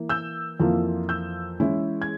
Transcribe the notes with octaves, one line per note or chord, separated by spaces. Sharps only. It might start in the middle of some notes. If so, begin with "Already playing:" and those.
Already playing: E3 A#3
E6 G6
F2 E3 A#3 F4
E6 G6
E3 G#3 C#4 E4
G#6